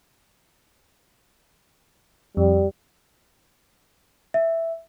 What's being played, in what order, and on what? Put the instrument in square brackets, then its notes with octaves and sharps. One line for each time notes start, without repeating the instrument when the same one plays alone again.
[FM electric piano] F2 [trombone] G3
[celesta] E5